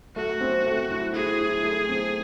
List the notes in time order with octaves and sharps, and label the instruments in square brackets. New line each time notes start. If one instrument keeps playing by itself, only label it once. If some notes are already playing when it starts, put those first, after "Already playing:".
[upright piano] A3 [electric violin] F#4
[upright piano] C4
A3
E4
[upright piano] E4 [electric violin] G#4
[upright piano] E4
A3
C4